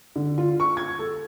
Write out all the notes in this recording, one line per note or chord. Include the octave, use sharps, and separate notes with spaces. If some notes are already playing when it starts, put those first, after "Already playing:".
D3
F4
C#6
G#6
A4